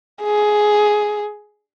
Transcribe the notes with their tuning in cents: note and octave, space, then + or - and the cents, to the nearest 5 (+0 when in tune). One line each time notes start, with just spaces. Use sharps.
G#4 +10